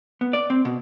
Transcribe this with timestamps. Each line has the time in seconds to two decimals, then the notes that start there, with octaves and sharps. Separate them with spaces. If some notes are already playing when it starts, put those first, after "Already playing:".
0.21 B3
0.33 D5
0.50 C4
0.65 B2